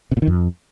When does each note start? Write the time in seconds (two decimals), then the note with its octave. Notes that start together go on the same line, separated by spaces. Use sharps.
0.11 C3
0.17 A#2
0.22 D#3
0.27 F2